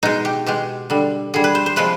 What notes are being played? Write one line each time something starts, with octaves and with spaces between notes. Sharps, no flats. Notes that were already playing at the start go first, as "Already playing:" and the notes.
B2 G#3 D#4
G4
B2 G#3 G4
D3 G3
D3 G3 G#4
B4
C5
C5
C3 F3 G#3 B4